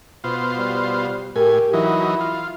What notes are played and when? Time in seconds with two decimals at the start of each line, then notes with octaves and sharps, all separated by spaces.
0.24 B2 F4 C5
0.57 G3
1.36 A2 G4 A#4 G#5
1.73 E3 F#3 D#4 E4
2.20 F4